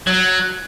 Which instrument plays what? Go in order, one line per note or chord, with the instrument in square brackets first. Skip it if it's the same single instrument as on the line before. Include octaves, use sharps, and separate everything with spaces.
[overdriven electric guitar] F#3